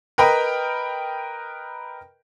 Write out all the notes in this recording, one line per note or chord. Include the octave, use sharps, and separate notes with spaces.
A#4 B4 D#5 G5 A#5 B5